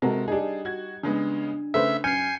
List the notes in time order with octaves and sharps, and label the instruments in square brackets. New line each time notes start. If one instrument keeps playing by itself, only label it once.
[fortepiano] C3 F#4 A#4 [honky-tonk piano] G#3 A4
[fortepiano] G3 D#4 [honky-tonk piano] D4 G#4
[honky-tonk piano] F#4 G#6
[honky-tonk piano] C#3 G#3 B3 [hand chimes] D4
[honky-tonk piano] C#3 A3 [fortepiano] B4 C5 [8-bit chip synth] E5
[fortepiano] F#2 F6 [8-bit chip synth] G#5 C7 [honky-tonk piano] G6 [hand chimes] C#7